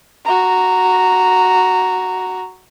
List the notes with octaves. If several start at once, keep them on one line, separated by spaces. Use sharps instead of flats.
F#4 A#5